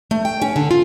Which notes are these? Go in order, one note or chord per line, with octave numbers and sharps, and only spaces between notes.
A3
G5
C#4
D3
F4